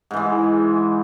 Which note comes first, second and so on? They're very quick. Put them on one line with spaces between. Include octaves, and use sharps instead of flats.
G#2 E3 G#3